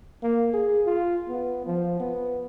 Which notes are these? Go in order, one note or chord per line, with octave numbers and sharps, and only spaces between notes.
A#3
G#4
F4
B3
F3
B3